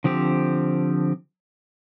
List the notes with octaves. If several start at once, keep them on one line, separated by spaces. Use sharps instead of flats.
D3 F3 C4 G4